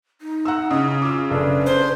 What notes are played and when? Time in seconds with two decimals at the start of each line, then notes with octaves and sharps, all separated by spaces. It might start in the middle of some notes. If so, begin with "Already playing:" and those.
0.21 D#4
0.45 F#5 A#5 E6
0.71 C#3 E4 D#5
1.02 F4 D6 E6
1.30 F#1 D4 A4 B4
1.66 D4 C5